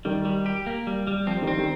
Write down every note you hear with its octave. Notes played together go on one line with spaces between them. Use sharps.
D#3 G3
G3
G4
A#3
G3
G3
F3 C4
D#3 G3
C4
D#3 G3